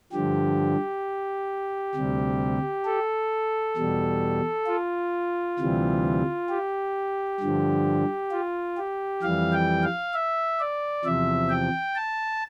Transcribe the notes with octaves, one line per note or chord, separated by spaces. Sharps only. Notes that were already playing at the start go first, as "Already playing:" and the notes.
G2 D3 F3 G4
D2 C3 G3
A4
E2 B2 G3
F4
D2 C3 E3 G3
G4
G2 D3 F3
F4
G4
F2 E3 G3 F5
G5
F5
E5
D5
E2 C3 F3 E5
G5
A5